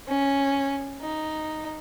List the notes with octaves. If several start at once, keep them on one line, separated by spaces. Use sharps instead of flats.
C#4
D#4